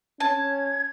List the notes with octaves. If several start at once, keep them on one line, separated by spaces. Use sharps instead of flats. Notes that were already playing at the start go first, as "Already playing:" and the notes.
C#4 A5 G#6